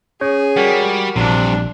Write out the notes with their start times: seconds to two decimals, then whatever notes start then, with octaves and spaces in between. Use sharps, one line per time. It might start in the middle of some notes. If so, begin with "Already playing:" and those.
0.21 C#4 G#4 C#5
0.57 G3 F#4 A#4 F#5
1.16 A#1 G2 C3 D4